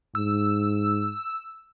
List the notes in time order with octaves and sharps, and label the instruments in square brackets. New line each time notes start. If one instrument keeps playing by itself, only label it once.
[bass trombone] G#2 [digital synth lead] E6